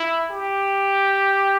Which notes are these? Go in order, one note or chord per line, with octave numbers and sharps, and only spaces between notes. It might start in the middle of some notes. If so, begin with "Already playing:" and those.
Already playing: E4
G4